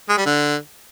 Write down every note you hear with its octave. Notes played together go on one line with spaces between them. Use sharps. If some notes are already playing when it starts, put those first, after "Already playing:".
G#3
G3
D3